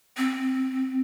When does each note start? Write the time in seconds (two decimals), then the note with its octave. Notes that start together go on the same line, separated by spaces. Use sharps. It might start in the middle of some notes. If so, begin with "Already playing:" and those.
0.17 C4